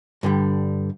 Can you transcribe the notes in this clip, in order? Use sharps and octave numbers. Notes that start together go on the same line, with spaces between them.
G2 D3 G3